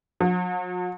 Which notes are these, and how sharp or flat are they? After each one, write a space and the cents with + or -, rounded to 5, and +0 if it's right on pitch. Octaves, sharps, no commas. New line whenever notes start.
F#3 -45